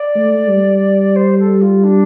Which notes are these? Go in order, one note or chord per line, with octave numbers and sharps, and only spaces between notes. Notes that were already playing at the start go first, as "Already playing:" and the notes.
Already playing: D5
A3
G3
C5
A4
F4
D4